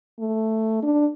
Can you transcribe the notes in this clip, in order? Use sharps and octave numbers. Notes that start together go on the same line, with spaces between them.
A3
D4